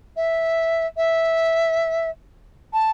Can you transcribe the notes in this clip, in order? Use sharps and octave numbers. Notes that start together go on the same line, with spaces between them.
E5
E5
A5